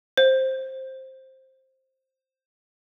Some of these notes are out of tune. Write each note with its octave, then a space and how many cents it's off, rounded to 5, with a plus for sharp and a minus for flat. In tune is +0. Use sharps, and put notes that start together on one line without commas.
C5 +10